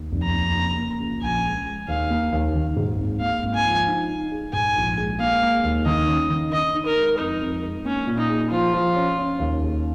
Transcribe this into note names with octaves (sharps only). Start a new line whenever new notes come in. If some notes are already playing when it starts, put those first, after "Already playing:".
Already playing: D#2
F1
A#5
A#3
C#3
A#3
C#2
A#1 G#5
G#3
G#3
D#2 F5
A#3
D#2
D#3
G#2
G#1
A#3 F5
G#1
G#5
F3
D#4
D#4
G#4
G#2 G#5
A#1
G#3
A#3 F5
A#3
D#2
D#3 D#5
C#4
D#3
D#4 D#5
D#4
A#4
G#3
F2 D#4
F2
G#3
A#3 C#4
A#2
D#4
G#4
F3 F4
F3
C#4
C#4
D#2
G#4